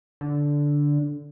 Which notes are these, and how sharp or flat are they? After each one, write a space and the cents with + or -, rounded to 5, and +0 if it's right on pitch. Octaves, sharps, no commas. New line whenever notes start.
D3 -10